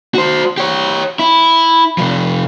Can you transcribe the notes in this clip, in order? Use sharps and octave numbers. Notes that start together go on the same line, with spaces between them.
F#4 C5
G4 C#5
E4
C3 F3